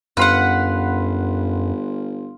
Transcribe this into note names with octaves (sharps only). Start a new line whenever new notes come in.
G1 F#2 B4 F5 F#5 C6